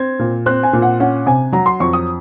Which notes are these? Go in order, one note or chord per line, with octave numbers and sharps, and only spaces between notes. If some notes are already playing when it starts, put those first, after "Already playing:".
Already playing: C4 G#6
A#2
C4 F#6
G#5
A#2
F#5
C#4 F#5
C3 G#5
F#3 A#5
C6
F2 C#6
D#6